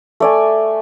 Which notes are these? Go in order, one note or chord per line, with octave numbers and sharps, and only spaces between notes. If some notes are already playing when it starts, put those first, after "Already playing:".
A3 D5 G#5